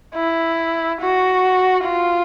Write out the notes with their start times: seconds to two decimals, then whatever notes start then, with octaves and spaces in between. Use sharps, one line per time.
0.15 E4
1.01 F#4
1.85 F4